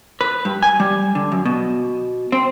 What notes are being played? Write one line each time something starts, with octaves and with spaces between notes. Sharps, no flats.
B4
G2
G#5
G3
D3
F#2
B2
C4